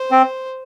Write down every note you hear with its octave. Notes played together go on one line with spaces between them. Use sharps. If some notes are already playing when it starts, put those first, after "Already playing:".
Already playing: C5
C4